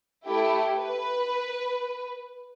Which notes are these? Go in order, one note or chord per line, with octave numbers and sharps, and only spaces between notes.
A3 E4 G4
B4